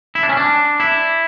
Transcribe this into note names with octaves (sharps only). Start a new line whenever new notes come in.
E4
D4
C#4
D4
E4